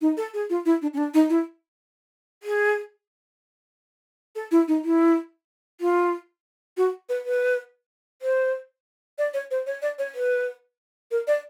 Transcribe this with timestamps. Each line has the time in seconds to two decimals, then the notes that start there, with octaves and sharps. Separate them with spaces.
0.01 D#4
0.17 A4
0.34 G#4
0.50 F4
0.65 E4
0.82 D4
0.93 C#4
0.97 D4
1.14 D#4
1.30 E4
2.43 G#4
4.35 A4
4.51 E4
4.68 D#4
4.84 E4
5.81 F4
6.77 F#4
7.09 B4
7.25 B4
8.22 C5
9.18 D5
9.34 C#5
9.51 C5
9.66 C#5
9.82 D5
9.98 C#5
10.15 B4
11.11 A#4
11.27 D5